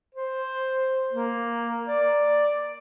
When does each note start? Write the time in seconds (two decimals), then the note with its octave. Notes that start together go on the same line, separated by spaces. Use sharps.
0.15 C5
1.13 A#3
1.87 D5